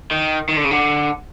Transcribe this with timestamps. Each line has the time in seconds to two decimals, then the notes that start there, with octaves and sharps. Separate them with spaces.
0.11 D#3
0.49 D#3
0.57 D3
0.64 C#3
0.71 D3